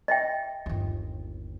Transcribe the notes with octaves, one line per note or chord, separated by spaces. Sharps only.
D#5 E5 G5
G1 D#2